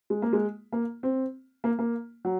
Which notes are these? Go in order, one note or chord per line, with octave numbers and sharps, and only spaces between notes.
G#3
A#3
G#3
A#3
C4
A#3
A#3
F#3